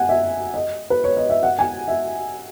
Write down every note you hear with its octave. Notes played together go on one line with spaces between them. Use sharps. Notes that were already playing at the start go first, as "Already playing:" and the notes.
Already playing: F#5 G#5
E5
D#5
B4
C#5
D#5
E5
F#5
G#5
E5